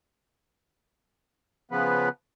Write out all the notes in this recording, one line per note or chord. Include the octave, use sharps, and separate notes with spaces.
C#3 F3 B3 B4